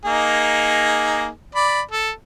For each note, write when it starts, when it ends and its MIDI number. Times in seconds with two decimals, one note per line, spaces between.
0.05 1.28 58
0.05 1.28 63
0.05 1.28 68
1.55 1.81 74
1.55 1.81 83
1.92 2.11 69